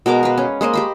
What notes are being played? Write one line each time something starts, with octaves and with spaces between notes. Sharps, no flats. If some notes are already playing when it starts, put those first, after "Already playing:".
B2 G#3 A#4 D6
B4 F5
C#4
G#3 A#3 C5 D#5
G4 C5 B5